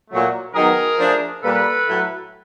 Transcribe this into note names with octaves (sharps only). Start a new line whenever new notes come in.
A#2 F#3 A3
D#3 F#3 B3 D#4 G#4 A#4
F3 A3 D4
A#2 G3 A#3 A4 B4
A2 F#3 A3